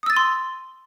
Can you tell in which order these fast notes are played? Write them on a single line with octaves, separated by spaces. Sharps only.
D#6 E6 A6 D#7 C6